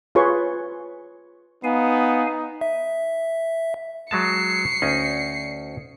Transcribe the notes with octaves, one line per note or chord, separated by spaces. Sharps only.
F4 G#4 B4 C#5 C6 C#6
B3 D#4 F5 G#5
E5
F#3 G#3 A5 C7 C#7
D2 C#4 D#4